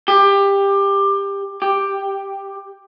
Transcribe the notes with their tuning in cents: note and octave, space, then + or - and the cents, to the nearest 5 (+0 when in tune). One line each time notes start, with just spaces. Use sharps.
G4 +20
G4 +5